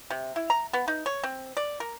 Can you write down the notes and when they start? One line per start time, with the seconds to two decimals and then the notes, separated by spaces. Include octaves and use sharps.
0.10 C3
0.36 E4
0.50 A#5
0.73 B3
0.88 D#4
1.06 C#5
1.24 C4
1.57 D5
1.80 A#4